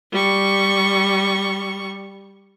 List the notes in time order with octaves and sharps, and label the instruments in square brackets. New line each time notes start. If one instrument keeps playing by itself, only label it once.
[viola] G3 C#6